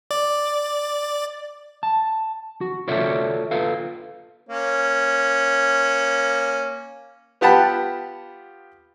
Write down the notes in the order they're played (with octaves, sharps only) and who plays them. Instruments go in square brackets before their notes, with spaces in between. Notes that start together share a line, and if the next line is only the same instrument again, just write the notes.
[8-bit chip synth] D5
[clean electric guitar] A5
F#4
F4 F#4 A4 C#5 D5 E5
F4 A4 B4 F5
[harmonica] A#3 C#4
[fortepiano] B3 F4 G4 F#5 A5 B5